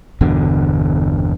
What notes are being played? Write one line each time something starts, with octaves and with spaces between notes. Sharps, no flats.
G1 E2 B2 D3